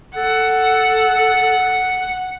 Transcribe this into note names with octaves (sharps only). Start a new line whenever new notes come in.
A4 F#5